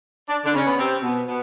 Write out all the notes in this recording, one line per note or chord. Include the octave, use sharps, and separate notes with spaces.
D4
D3 D4
C#3 C#4
B3
C3 C4
B2 B3
B2 B3